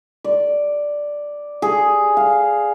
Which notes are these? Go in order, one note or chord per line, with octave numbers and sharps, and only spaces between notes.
D5
G#4
F5